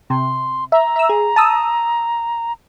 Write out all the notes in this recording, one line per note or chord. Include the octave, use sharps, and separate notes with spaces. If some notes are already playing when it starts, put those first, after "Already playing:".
C3 C6
E5 A#5
E5 E6
G#4
A5 D#6 E6